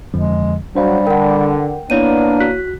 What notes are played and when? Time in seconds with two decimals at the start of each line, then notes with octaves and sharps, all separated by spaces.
0.14 F2 D3 F3 G#3
0.75 F#3 G3 D4 C5 F5
1.07 D3 A#4 F#5 G5
1.90 A#3 B3 D4 E4 C#5 D#7
2.41 F#4 F#6 B6